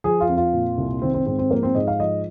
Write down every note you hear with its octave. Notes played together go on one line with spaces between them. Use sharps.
F3 G#4
F4
F2
F4
A#2
C2
D#3 C4
C4
G#2 C4
C4
F3 A#3
C4
G#2 D#5
F5
F3 D#5